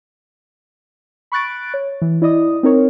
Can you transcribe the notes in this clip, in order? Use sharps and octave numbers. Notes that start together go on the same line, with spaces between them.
B5 C#6 F#6 A6 D7
C#5
E3
E4 D5 D#5 D#6
C4 D#4 A#4 C#5